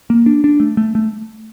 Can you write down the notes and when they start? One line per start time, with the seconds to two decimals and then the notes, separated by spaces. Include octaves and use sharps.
0.10 A#3
0.26 D4
0.44 D4
0.60 A3
0.77 A3
0.95 A3